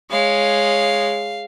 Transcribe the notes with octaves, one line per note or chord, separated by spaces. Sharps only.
G#3 C#5 F5